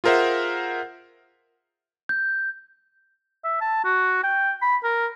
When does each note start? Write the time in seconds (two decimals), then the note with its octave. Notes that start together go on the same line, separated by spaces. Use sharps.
0.04 F4 G#4 A#4 C5 E5 F#5
2.09 G6
3.44 E5
3.61 A5
3.84 F#4
4.23 G5
4.62 B5
4.84 A#4